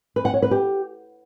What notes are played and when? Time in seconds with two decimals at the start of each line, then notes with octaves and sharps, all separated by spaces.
0.16 B4
0.25 F#5
0.34 C#5
0.42 B4
0.51 G4